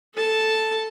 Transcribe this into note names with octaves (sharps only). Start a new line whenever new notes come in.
A4 A5